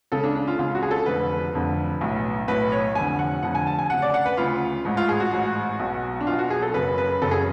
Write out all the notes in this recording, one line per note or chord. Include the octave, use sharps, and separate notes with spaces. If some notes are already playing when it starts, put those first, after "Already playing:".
C#2 C#3 A4
D4
D4
F4
C#2 C#3 F4
F#4
G#4
A4
F1 F2 D3 B4
F1 F2 D3
B1 A2
B1 A2 B4
C#5
F1 F2 D3 G#5
F#5
F1 F2 D3 F#5
G#5
A5
G#5
D2 C#3 F#5
D5
F#5
B4
D2 C#3 F4
A1 G#2
F4
G#4
F#4
A1 G#2
B1 B2
D4
B1 B2 F4
F#4
G#4
A4
F#1 F#2 C#3 B4
B4
F#1 F#2 C#3 A4
G#4